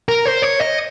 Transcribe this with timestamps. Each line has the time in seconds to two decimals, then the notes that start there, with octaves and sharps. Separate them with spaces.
0.09 A#4
0.25 C5
0.42 C#5
0.60 D#5